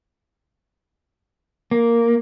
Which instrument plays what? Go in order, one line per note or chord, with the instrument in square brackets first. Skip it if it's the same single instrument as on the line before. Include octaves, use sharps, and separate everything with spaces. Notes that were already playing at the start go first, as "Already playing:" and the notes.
[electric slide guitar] A#3